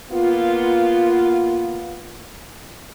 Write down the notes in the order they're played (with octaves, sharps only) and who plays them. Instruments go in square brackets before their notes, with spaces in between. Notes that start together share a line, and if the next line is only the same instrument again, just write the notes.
[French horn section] A#3 B3 F4